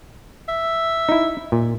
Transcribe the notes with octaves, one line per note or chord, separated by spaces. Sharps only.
E5
D#4 E4
A#2